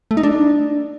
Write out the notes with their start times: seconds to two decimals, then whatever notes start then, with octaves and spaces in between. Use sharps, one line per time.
0.11 A3
0.17 D#4
0.23 D4